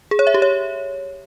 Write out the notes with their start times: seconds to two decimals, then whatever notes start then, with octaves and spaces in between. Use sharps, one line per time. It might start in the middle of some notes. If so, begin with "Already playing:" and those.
0.11 G#4
0.19 C#5
0.27 E5
0.34 G4
0.42 C#5